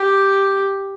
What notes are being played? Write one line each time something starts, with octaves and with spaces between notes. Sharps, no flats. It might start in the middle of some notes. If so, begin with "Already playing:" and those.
Already playing: G4